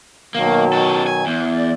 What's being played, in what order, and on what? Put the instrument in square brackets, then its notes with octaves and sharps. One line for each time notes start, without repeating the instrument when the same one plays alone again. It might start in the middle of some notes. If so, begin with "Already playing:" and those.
[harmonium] B2 D#3 F#3 [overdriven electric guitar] A#3
[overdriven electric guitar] C#4 A4
G#5
E2
[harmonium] D5